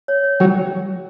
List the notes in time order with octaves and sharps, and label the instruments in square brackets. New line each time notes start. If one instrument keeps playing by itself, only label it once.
[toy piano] C#5
C#5
[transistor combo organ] F#3 [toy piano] G5